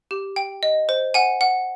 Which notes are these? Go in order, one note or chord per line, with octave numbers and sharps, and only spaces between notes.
G4
G5
D#5
C5
F#5 G#5
F#5